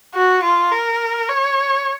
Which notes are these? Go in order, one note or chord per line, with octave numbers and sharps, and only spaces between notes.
F#4
F4
A#4
C#5